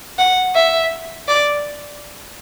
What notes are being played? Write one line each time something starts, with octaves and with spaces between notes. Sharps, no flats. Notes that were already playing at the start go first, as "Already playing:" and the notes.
F#5
E5
D5